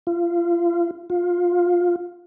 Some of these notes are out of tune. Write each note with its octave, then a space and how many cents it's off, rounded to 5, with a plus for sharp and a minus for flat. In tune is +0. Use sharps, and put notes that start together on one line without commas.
F4 -30
F4 +15